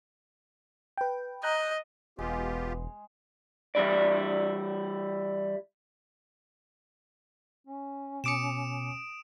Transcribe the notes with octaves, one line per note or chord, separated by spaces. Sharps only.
B4 G5
D#5 A#5 F#6 G6
E1 G#3 B3 F4 G4
E3 G3 E4 D5
C#4
B2 D6 D#6 C#7 D7 E7